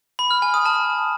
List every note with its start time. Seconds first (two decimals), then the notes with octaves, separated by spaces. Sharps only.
0.19 B5
0.31 F6
0.42 G#5
0.54 D#6
0.66 A5